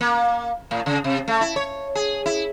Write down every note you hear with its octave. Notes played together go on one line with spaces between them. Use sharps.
A#3
A2
C#3
C3
A3
E4
C#5
G#4
E4